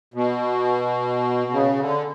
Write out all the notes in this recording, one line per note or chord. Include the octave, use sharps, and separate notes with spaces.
B2
C#3
D3